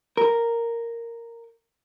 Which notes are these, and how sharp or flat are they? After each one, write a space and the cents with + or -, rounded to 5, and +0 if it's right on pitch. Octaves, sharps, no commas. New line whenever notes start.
A#4 -5